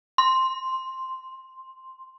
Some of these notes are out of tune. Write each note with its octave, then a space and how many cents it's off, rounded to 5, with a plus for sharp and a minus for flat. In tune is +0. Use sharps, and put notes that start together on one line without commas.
C6 +5